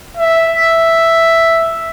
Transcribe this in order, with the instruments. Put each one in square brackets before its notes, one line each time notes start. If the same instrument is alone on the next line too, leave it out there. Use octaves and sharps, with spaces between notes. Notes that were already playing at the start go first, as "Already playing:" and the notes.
[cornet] E5